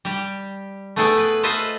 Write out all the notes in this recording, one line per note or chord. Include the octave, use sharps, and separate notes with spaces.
G3 G4
A3 B3 G#4 A4 G5
B4
F4 A4 B4 C5 D#5 E5